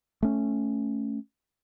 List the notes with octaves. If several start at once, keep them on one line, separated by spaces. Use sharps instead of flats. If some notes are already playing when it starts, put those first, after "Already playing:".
A3 C#4